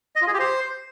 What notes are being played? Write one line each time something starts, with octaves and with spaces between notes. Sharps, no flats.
D#5
F4
G#4
G4
C5